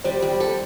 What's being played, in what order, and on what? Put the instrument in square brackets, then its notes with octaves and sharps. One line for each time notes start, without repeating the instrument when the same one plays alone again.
[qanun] G3 [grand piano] C5
[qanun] G3
A4